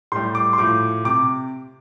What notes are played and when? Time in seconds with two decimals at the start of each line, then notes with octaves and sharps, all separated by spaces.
0.12 A2 G3 C6
0.35 D6
0.53 C6
0.58 A2 F3 D6
1.04 C3 D6